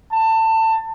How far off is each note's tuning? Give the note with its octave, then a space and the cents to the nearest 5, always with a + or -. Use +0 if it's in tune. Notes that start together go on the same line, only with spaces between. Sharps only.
A5 +25